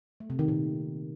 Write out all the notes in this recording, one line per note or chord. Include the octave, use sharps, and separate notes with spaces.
A3
C3
D#3
A#2